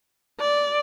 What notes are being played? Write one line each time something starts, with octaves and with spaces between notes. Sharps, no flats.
D5